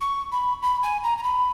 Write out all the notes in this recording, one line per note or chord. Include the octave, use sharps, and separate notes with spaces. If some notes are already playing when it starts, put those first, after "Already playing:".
C#6
B5
B5
G#5
A#5
A#5
B5